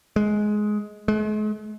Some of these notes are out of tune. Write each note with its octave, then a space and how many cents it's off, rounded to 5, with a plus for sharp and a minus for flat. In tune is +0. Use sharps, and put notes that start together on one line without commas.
G#3 +15
G#3 +45